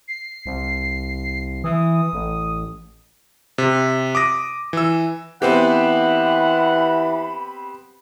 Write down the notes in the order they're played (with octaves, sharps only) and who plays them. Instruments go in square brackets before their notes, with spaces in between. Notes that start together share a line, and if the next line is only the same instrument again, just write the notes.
[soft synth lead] C7
[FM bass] C2
[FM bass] E3 [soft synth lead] D#6
[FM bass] A1
[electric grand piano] C3
D6 D#6 A#6
E3 E6
[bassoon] E3 [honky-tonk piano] B3 C4 G4 [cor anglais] F#5 [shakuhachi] B5